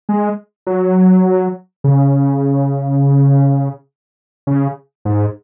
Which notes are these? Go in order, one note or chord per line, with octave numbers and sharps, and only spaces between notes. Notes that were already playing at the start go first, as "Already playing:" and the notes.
G#3
F#3
C#3
C#3
G#2